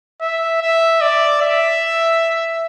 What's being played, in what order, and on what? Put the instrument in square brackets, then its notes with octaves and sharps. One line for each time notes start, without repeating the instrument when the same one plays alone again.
[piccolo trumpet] E5
E5
D5
E5